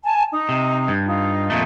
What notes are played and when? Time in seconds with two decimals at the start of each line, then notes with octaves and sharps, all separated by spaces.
0.04 G#5 A5
0.32 D#4
0.49 C3
0.88 G2
1.05 D#4 F4
1.50 F2 A#2 A3